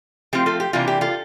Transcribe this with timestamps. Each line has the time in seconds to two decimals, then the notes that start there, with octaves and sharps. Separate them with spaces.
0.33 F3 A3 C4 F4 G4
0.46 F4 A4
0.60 G4
0.73 C3 E3 A#3 D4 F4
0.88 G4
1.01 F4 A4